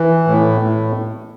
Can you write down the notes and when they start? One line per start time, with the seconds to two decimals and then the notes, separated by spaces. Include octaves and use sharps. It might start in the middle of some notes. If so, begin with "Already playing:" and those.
Already playing: E3
0.27 A2
0.61 A2